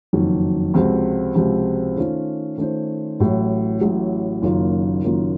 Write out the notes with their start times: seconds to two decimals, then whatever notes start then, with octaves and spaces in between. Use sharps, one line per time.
0.13 F#1 F2 D#3 F#3
0.74 C#2 C3 F3 C4 F#4
1.35 C#2 C3 F3 C4 F#4
1.96 D#3 A3 C#4 F4 C5
2.58 D#3 A3 C#4 F4 C5
3.20 A1 A2 F#3
3.81 A1 A2 F#3
4.42 F#1 F#2 D#3 A#3 F4
5.03 F#1 F#2 D#3 A#3 F4